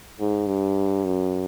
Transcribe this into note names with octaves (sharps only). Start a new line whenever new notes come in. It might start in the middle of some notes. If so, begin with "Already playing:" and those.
G#2
G2
F#2